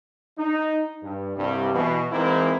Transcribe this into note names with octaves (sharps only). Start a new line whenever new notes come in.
D#4
G2
C2 G2 G3
B2 E3
E3 G#3 A#3 C4 D#4 E4